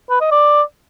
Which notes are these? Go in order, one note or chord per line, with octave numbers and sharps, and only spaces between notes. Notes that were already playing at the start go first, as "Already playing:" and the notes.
B4
D#5
D5